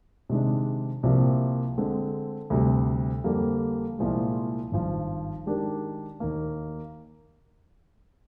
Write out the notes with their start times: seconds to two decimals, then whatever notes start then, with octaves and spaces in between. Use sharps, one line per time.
0.30 C3 D#3 G#3 D4
1.03 C2 C3 F3 A#3
1.78 D3 G#3 C4
2.50 D2 C3 G3
3.24 F2 D3 G3 A#3
3.99 C2 A#2 F3 G#3
4.72 G#1 G2 F3
5.46 D#3 G#3 D4 G4 A#4
6.20 D#2 D#3 A#3